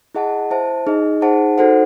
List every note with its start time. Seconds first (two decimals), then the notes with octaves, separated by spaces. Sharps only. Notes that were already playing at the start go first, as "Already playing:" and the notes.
0.15 E4 G#4 D#5 F#5 A5
0.51 E4 C5 E5 A5
0.87 D#4 G#4 D#5
1.21 D#4 G#4 C5 F#5 A5
1.58 D#4 F#4 A4 C5 F#5